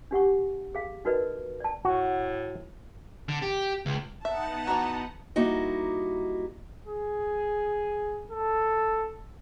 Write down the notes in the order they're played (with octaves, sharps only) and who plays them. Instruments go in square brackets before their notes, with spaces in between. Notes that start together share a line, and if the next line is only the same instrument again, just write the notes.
[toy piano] D4 G4 F#5 C#6
G#4 F5
D#4 F#4 A#4 B4 D5 D#5
D5 A5
[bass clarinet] A2 [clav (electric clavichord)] F#4
[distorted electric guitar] D3
G4
C#2
[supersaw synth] B3 D#4 F#5 [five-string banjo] E5 [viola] A5
[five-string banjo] E3 F#4 [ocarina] A#5
[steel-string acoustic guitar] G3 A#3 D#4 E4 F#4 D#5
[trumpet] G#4
A4